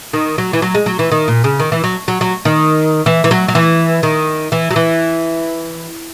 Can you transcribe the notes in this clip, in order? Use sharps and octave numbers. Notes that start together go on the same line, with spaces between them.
D#3
F#3
E3
F#3
G#3
F#3
E3
D#3
A#2
C#3
D#3
E3
F#3
F#3
F#3
D#3
E3
E3
F#3
F#3
E3
D#3
E3
F#3
E3